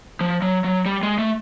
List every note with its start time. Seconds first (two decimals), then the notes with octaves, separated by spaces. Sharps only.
0.21 F3
0.42 F#3
0.64 F#3
0.86 G3
1.03 G#3
1.18 A3